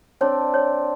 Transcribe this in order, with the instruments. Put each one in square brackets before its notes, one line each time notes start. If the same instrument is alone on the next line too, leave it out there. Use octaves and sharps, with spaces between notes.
[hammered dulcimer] C4 D4 [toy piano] C#5
[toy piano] C#5